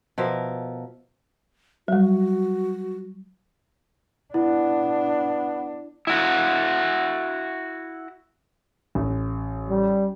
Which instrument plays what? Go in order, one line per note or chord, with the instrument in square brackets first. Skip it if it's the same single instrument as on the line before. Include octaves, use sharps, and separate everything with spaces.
[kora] B2 F3 A#4 E5
[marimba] F#3 G3 [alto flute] F#4
[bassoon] B3 [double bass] D4 [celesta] E4
[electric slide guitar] E4 F#4
[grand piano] A1
[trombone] G3